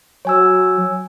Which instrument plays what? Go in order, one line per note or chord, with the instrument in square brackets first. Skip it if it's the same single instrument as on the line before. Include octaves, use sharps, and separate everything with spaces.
[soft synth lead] F#3 [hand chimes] C#5 G#5 E6